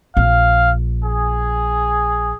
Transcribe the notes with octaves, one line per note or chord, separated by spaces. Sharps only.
A#1 F5
G#4